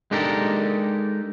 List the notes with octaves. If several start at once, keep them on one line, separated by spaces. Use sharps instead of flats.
G#3 D4 D#4 G4 A4 A#4